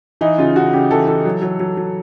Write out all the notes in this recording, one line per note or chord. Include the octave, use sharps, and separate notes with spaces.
E3 D#4
C#3 F4
C#3 F#4
C#3 G4
E3 A4
E3 A4
F#3
F#3
F#3
F#3